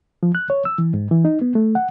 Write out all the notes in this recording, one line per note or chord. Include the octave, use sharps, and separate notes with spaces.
F3
F#6
C#5
E6
E3
G#2
E3
D#4
B3
A3
F#5